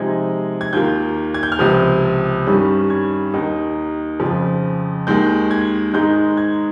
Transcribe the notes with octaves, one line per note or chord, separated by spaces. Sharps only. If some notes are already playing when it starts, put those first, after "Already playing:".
Already playing: C3 F3 G#3 D#4 G#6
G#6
D#2 D#3 A#3 F4 G6
G#6
G6
F6
C#2 C3 F3 D#6
G2 D#3 G3 C#4
G#6
D#2 D#3 A#3 D#4
F2 C#3 F3
D#2 D#3 G#3 G6
G#6
G#2 D#3 G#3 D#4 G6
G#6